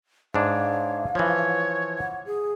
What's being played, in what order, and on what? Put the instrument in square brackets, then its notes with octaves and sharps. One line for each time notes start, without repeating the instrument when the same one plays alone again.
[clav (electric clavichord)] G#2 D4 [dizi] C#5 [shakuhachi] F5
[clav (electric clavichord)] E3 F3 [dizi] C#5
[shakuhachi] F#5
G#4